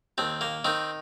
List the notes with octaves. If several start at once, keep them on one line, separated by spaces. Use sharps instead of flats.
D#2 C4
A#3
D#3 C4